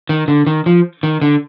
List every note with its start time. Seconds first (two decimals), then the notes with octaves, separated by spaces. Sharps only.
0.09 D#3
0.28 D3
0.47 D#3
0.66 F3
1.03 D#3
1.22 D3